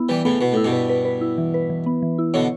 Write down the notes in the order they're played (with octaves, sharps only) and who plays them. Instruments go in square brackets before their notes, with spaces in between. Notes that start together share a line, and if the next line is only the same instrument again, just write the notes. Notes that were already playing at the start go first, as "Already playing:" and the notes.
Already playing: [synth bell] B3 E4
[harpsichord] E3 G3 [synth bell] B4
[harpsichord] A2 C#3 [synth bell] B3
[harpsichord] B2 [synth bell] B4
[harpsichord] A2 [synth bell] E4
[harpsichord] G2 B2
[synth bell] B4
B4
B4
E4
E3
B4
E3
B3
E3
E4
[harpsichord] B2 D3 [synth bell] C#5